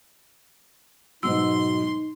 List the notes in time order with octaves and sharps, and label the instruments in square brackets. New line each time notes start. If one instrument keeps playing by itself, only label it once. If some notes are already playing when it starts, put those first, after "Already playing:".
[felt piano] G#2 B2 F#3 [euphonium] D#4 [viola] C6 [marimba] E6